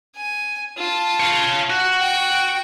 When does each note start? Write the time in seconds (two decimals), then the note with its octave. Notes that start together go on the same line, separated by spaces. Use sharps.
0.16 G#5
0.78 F4 A5
1.20 C#5 F5
1.70 F#4
2.00 G5